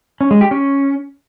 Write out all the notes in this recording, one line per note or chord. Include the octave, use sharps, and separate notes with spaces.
C#4
G#3
G4
C#4